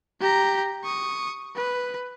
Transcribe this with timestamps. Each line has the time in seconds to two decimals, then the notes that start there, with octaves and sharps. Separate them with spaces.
0.21 G4 A#5
0.84 C#6 D#6
1.56 B4